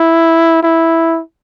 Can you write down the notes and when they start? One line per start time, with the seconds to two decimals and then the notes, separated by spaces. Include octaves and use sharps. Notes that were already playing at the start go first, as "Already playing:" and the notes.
Already playing: E4
0.63 E4